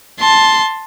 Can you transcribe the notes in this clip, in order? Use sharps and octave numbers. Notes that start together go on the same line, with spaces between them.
A5 C6